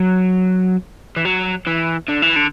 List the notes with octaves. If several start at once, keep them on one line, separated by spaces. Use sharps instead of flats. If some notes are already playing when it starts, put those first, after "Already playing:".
Already playing: F#3
E3
F#3
E3
D3
E3
D3